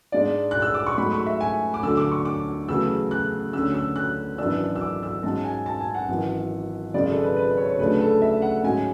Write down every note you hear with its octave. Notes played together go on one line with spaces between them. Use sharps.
G#2 G#3 D4 D5
F#6
E6
D6
C#6
G#2 F#3 A3 B5
C#6
E5
G#5
D6
D2 D3 F#3 A3 E6
D6
C#6
D6
E2 C#3 F#3 A3 E6
F#6
D2 D3 F#3 C#4 E6
E6
F#6
G#1 F#2 E3 B3 D4 E6
E6
D6
E6
G#2 F#3 C#4 A5
G#5
A5
G#5
F#5
G#1 F#2 E3
G#1 F#2 C#3 G#3 D5
A4
B4
B4
C#5
C#5
D2 C#3 F#3 A3 D4 B4
A4
E5
F#5
G#2 F#3 C#4 G#5